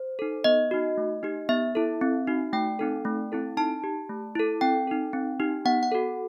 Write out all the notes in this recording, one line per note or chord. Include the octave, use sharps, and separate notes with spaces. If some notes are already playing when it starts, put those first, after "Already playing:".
Already playing: C5
D#4 A4
B3 D#5
D#4 F#4
A3
D#4 G4
B3 E5
E4 A4
C4
D#4 F#4
A3 G5
C4 D#4 A4
A3
C4 E4 A4
D#4 A5
G4
A3
E4 A4
C4 G5
D#4 A4
C4
D#4 G4
B3 F#5
F#5
F#4 A4